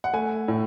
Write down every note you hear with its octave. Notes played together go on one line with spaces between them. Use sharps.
F#5
A3 G#5
A2